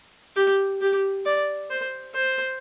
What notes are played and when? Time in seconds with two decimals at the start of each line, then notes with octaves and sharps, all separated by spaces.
0.36 G4
0.81 G4
1.26 D5
1.70 C5
2.15 C5